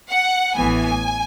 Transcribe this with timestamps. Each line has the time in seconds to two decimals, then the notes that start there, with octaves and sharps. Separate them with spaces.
0.10 F#5
0.55 A1 A2 E3 B3 G#5